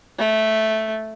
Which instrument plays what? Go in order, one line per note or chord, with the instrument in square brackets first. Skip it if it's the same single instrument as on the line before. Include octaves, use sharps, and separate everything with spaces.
[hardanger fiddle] A3